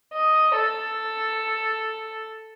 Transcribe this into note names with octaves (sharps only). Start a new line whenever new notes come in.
D#5
A4